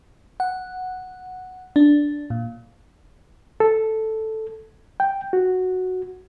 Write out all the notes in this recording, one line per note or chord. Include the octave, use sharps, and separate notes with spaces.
F#5
D4
A#2
A4
G5
F#4